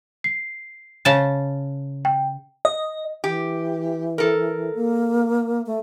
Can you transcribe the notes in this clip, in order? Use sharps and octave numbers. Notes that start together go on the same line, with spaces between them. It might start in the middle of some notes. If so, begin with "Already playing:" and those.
C7
C#3 A5
G5
D#5
E3 G4
A4 A#4
A#3
A3